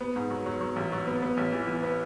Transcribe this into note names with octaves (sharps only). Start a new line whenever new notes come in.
B3
G#2
F#3
F#3
F#3
A1
F#3
B3
B3
A1
E3
E3
B3